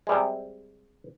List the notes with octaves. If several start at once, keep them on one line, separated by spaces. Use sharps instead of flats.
C3 G3 G#3